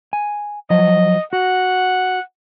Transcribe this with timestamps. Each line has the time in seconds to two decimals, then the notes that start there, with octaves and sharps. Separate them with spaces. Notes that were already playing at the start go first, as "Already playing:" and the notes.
0.13 G#5
0.70 F3 F#3 D#5
1.33 F#4 F#5